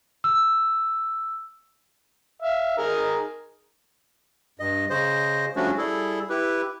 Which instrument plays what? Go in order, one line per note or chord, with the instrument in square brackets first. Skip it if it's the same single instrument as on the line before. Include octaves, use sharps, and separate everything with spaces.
[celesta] E6
[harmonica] E5 F5
D#4 G#4 A#4
[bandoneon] G2 D#5
C#3 C5 D#5
F3 G3 A3 C#4 D4 F#4
G3 E4 G#4 A4
E4 G4 B4